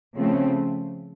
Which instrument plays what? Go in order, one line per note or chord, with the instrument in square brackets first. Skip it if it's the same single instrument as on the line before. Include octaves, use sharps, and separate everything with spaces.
[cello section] C#3 F3 A3 C4